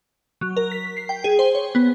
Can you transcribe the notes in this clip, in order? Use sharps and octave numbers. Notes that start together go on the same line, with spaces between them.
F#3
A#4
B6
C7
G5
G#4
C5
C#5
B3